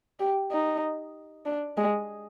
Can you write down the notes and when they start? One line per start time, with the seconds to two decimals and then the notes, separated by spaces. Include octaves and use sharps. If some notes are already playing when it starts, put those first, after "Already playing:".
0.20 G4
0.51 D#4
1.46 D4
1.77 G#3